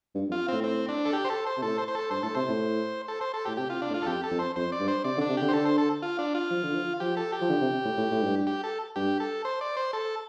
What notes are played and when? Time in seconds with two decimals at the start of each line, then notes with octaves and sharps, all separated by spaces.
0.15 G2
0.28 F2
0.32 F4
0.48 A2 C4
0.64 C4
0.89 D4
1.05 A4
1.13 G4
1.24 C5
1.30 A4
1.46 C5
1.57 C3
1.62 A2 A4
1.78 C5
1.88 C5
1.95 A4
2.10 G2 C5
2.23 A2 A4
2.35 C3 C5
2.48 A2
3.08 A4
3.21 C5
3.34 A4
3.46 A2 G4
3.57 C3 G4
3.70 C3 F4
3.82 D4
3.90 A2
3.94 F4
4.02 A4
4.06 F2 G4
4.23 A4
4.31 F2
4.39 C5
4.56 F2 C5
4.72 D5
4.80 G2
4.88 C5
5.04 C3 D5
5.17 D3
5.21 D4
5.29 C3
5.37 D3 G4
5.49 C5
5.53 D3 A4
5.66 C5
5.78 A4
6.02 F4
6.19 D4
6.35 F4
6.51 F3
6.63 D3
6.75 F3
7.00 F3 G4
7.17 A4
7.32 G4
7.41 F3
7.49 D3
7.62 C3
7.85 A2
7.97 A2
8.11 A2
8.22 G2
8.47 G4
8.64 A4
8.96 G2 G4
9.20 A4
9.45 C5
9.61 D5
9.77 C5
9.93 A4